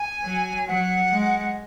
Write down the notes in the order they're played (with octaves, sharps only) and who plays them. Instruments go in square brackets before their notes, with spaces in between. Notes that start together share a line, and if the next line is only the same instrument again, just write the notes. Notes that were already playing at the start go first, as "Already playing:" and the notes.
Already playing: [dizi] G#5
[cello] F#3
[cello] F#3 [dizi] F#5
[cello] G#3